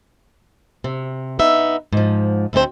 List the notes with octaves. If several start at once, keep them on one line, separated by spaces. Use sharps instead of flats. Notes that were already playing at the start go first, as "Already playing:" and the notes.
C3
B3 D#4 E5
G#2 F3
D2 G#2 A3 C4 C5